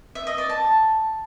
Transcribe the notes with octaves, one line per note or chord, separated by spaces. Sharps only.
E5
D#5
D5
A5